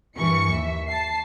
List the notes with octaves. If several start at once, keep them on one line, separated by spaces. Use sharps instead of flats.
G2 E3 A#4 C#6 C#7
D#2 E5
A5 C7